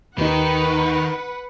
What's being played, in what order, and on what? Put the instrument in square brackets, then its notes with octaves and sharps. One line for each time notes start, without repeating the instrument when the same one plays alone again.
[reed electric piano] D#2 D#4 [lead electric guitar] D#3 [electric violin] B4 F#5